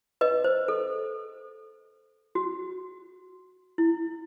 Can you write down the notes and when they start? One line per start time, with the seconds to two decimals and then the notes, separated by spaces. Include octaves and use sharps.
0.21 B4 D#5
0.44 C5
0.68 A4
2.35 F#4
3.78 E4